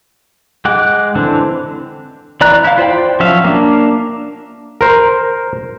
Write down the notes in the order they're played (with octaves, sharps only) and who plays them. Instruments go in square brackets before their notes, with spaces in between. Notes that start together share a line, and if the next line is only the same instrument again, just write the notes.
[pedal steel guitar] G#3 F#5 G5 D6
D3 E3 C4 D4
E3 D5 A#5 F#6
E4 F5
F4 C5 D5 G5
F3 F#3 C#4 E5 F5
A#3 D4
[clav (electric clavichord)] A#4 C5